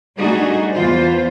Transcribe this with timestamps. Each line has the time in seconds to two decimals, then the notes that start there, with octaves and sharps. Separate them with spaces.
0.18 G3 A3 D4 D#4 F#4 G#4
0.74 E2 E3 F4 C5